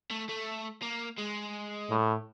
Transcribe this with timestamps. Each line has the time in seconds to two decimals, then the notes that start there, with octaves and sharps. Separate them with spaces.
0.11 A3
0.29 A3
0.83 A#3
1.18 G#3
1.90 A2